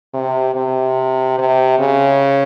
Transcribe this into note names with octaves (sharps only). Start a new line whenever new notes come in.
C3
C3
C3
C#3